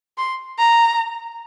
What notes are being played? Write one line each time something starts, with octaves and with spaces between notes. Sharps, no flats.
C6
A#5